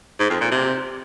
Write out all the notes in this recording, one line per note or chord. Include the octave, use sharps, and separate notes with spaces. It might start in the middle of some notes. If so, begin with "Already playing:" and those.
G#2
F2
A#2
C3